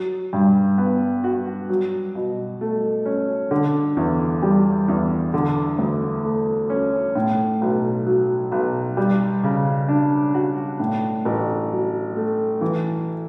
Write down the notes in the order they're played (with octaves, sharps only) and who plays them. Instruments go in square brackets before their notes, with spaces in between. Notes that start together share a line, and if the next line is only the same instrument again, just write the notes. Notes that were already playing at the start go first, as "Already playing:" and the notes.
Already playing: [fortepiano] F#3
G2
B3
F#4
F#3
B2
A3
C#4
D3
E2
G3
E2
D3
D2
A3
C#4
A2
B1
F#3
B1
G3
C#3
D4
F#4
A2
A1
F#3
A3
E3